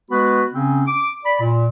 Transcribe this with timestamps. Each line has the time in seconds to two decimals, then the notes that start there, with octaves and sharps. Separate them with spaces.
0.11 G#3 B3 F#4 B4 B5
0.54 C#3 C4 C#4
0.87 D6
1.25 D5 B5
1.40 A#2